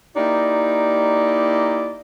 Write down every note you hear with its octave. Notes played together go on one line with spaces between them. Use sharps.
A#3 D#4 E4 G4 D5 D#5